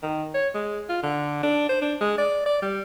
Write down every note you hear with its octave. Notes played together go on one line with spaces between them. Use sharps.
D#3
C#5
G#3
F4
D3
D4
C5
D4
G#3
D5
D5
G3